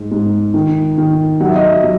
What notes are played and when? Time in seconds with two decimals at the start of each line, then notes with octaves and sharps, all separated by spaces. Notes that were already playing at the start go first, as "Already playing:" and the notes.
Already playing: G#2
0.11 G#2
0.54 D#3
0.98 D#3
1.40 F#3 F#5
1.49 E5
1.56 D#5
1.64 E5
1.83 F#3